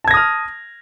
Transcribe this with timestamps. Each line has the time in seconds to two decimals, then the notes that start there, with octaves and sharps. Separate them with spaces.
0.04 A5
0.08 G#6
0.11 A#6
0.14 D#6
0.17 F6